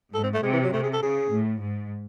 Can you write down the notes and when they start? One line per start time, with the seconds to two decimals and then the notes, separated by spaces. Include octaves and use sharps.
0.14 G#2 A4
0.23 C4
0.34 A3
0.43 C3 G#3
0.53 E3
0.64 F#3
0.73 C3 A3
0.83 G#4
0.93 A4
1.02 C#3 G#4
1.32 A2
1.62 G#2